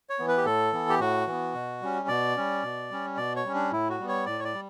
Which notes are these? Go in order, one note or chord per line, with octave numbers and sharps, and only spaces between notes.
C#5
E3 B3
B4
G4
A2 A4
E3 B3
G4
A2 F#4
E3 B3
B2
G3 C#4
B2 D5
G3 C#4
B2
G3 C#4
B2 D5
C#5
G3 C#4
D4
A2 E4
F#4
G3 B3
C#5
A2 D5
C#5
D5
G3